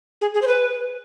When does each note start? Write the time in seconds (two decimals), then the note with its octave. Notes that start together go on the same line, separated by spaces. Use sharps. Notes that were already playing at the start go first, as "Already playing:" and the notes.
0.21 G#4
0.34 G#4
0.42 C5
0.48 B4